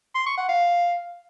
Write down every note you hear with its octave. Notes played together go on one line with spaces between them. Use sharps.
C6
C#6
F#5
F5